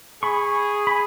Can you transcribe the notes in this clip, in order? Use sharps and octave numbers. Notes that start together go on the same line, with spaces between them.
G#4 B5 C#6
B5